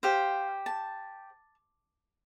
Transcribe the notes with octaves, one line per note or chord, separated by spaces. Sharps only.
G4 C5 F5
A5